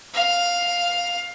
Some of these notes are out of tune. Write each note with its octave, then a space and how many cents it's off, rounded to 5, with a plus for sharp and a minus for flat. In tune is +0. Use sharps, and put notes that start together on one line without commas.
F5 +5